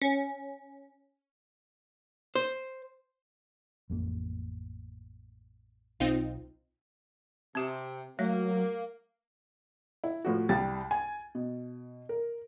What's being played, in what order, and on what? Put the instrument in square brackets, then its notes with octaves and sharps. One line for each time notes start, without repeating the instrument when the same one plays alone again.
[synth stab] C#4
[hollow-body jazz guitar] C5
[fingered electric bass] A1 F2 A#3
[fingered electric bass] B1 [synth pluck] C4 D#4 F4
[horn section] C3 [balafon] C4 G4
[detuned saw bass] F#3 [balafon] A3 C#5 E5 [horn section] A#3
[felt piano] E4
A2 F3 F#4
C2 G3 G5 A6
G#5
B2
A#4